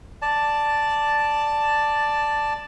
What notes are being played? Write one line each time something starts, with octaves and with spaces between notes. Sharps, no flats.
D5 A5